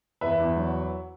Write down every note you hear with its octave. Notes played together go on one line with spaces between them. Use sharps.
E2 B4 E5
E2
F#3